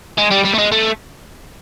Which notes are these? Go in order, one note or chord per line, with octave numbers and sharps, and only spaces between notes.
G#3
G3
G3
A3
G#3
A3